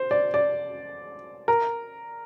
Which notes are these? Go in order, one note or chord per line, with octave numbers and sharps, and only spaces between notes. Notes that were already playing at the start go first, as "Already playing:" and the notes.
Already playing: C5
D5
D5
A#4